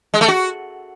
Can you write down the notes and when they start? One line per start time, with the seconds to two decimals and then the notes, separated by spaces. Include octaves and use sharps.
0.14 G#3
0.21 A3
0.28 F#4